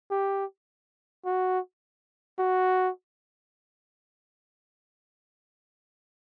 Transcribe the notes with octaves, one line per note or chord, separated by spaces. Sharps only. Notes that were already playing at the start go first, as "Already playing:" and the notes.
G4
F#4
F#4